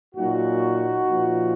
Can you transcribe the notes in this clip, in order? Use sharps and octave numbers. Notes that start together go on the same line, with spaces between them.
A#2 F#3 D#4 F#4
A#2 F3